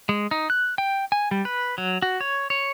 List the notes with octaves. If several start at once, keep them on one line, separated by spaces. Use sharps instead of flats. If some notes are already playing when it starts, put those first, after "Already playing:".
G#3
D#4
F#6
G5
G#5
G3
B4
F#3
F#4
C#5
C#5